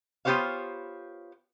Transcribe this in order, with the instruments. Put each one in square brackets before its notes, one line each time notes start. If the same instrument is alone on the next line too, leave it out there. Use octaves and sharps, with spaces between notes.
[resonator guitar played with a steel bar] B3 F4 G4 C5 C#5 F5